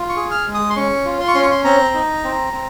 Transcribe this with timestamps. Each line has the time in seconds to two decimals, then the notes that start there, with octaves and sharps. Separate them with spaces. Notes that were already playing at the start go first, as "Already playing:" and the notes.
Already playing: F4
0.09 C#6
0.16 G#4
0.31 F6
0.46 G#3
0.54 D#6
0.70 C6
0.76 C#4 C#6
1.05 F4
1.20 C6
1.28 C#6
1.35 C#4 C6
1.43 C#6
1.51 C6
1.64 C4 A#5
1.95 D#4
2.24 C4
2.53 C4